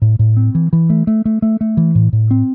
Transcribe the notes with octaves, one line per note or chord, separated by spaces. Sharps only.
A2
A2
C4
E3
E3
A3
A3
A3
A3
A3
E3
A2
A2
C4